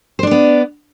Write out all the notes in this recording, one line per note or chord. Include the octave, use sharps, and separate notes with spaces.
B3 D4 C5 D5